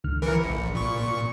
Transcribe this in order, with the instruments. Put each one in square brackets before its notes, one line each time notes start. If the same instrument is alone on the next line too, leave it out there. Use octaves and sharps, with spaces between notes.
[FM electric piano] C#2 D3 F6
[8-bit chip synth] E3 A#4 [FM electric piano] B5 C#7
[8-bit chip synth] A#1
A#2 C#6